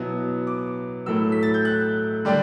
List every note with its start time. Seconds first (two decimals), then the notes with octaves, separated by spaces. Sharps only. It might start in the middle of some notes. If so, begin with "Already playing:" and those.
Already playing: B2 F#3 B3 E4
0.47 D6
1.06 A2 F#3 A3 E4 E6
1.32 B6
1.43 A6
1.54 G6
1.65 F#6
2.25 D3 G3 D4